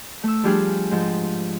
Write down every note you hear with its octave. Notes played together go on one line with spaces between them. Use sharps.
A3 E6
F3 G3 D4 G4 G#4 F5
G#2 F3